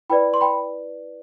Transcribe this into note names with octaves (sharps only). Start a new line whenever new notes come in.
E4 B4 D5 G5 B5
C6
G5 B5